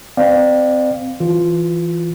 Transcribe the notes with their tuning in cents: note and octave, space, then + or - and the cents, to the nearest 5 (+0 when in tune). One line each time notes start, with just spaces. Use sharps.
C4 -15 D5 +30 F5 +0
E3 +15 F4 +0